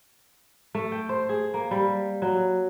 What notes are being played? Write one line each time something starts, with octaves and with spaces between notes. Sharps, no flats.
A3
G5
C5
G#4
A#3
G3
F#3